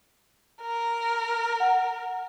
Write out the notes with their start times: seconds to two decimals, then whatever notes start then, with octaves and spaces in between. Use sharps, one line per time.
0.62 A#4
1.60 F#5